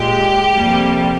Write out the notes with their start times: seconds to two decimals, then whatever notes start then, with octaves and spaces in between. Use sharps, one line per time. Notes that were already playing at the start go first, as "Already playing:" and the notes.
Already playing: A#2 G#3 G4
0.54 F2 C3 G3 A#3